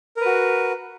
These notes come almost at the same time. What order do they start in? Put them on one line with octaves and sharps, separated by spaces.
A#4 B4 F#4